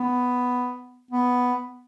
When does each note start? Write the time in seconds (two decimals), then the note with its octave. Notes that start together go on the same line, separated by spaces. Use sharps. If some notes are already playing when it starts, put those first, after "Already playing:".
Already playing: B3
1.11 B3